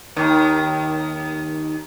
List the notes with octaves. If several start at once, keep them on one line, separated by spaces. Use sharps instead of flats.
D#2 D#3